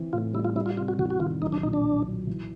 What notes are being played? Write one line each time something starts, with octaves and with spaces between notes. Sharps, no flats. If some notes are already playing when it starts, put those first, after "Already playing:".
Already playing: E3 C4
A2 F4
G3 E4
F4
G3 E4
F4
C3 F4
F#4
E2 F#4
F#4
D#3 F4
B1 D#4
D4
A#2 D#4
D4
B1
F#3
E3